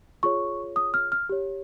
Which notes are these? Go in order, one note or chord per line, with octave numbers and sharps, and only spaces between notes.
F4 G#4 C#5 C#6
D#6
F6
F6
G4 C#5